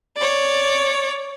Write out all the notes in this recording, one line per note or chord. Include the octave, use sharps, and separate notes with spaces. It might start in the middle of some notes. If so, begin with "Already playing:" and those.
C#5 D5